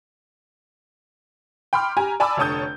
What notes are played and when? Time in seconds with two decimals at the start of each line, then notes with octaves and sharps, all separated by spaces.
1.73 G5 B5 C6 D6 F6
1.97 G4 G#5 A#5
2.20 D5 G#5 A5 B5 D6 E6
2.37 F1 D3 C#5 A5 D#6 G6